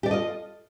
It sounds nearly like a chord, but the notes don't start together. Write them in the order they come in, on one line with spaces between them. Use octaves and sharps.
G4 D5 A4 D#5 F4